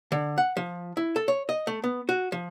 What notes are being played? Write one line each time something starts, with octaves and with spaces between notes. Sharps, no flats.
D3
F#5
F3
E4
A4
C#5
D#5
A3
B3
F#4
F3